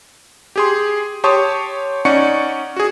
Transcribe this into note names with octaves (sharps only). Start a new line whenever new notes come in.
G4 G#4 C6
G4 C#5 A5 C6 C#6 D#6
C#4 D#4 D5 F#5 C#6 C#7
F#4 G#4